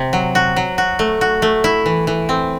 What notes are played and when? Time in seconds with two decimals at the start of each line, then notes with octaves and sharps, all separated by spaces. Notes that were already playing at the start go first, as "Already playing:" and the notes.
Already playing: C3
0.13 F#3
0.35 F#4
0.56 F#3
0.78 F#4
0.99 A3
1.21 F#4
1.42 A3
1.64 E4
1.86 E3
2.07 E3
2.29 C4